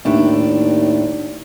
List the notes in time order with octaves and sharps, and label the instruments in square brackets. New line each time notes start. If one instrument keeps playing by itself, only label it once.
[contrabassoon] D#2 [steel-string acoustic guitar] A2 D4